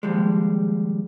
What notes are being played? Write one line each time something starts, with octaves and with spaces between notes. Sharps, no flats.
D#2 F3 G3 G#3